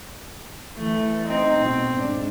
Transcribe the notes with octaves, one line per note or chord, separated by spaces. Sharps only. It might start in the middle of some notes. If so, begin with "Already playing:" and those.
E3 A3
C4 D#4
B2
G#2 D4